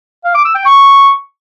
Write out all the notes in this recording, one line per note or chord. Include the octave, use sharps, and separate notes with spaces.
F5
D6
E6
G5
C#6